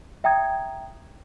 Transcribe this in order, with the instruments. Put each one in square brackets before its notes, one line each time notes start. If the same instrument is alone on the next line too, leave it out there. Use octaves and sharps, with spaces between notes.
[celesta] E5 G5 A#5 D#6 G#6